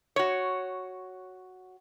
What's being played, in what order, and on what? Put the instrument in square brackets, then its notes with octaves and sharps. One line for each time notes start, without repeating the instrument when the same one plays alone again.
[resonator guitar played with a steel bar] F#4 C#5